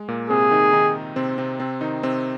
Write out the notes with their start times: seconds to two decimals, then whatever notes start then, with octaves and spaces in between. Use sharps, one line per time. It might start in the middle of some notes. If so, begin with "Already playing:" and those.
Already playing: G#3
0.08 A#2 A#3
0.30 C3 C4 G#4
0.51 D#3 D#4
0.73 D#3 D#4
1.16 C3 C4
1.38 C3 C4
1.60 C3 C4
1.81 D#3 D#4
2.03 C3 C4